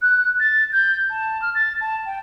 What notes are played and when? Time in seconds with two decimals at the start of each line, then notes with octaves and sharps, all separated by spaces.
0.01 F#6
0.39 A6
0.72 G6
1.10 A5
1.42 F6
1.55 A6
1.81 A5
2.06 G5